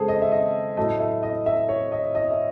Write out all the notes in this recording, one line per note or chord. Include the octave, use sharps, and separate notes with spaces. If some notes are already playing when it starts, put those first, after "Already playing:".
Already playing: C#3 G#3 G#4 A4 C5
D#5
E5
D#5
A2 F#3 A3 D#5
E5
D#5
E5
C#5
D#5
D#5
E5